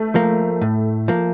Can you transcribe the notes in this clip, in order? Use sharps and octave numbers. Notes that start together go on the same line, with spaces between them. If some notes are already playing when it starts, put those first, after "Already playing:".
Already playing: A3
F3 A#3
A2
F3 A#3